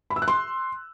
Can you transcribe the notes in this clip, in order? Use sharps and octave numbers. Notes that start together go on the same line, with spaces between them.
B5
E6
F#6
C6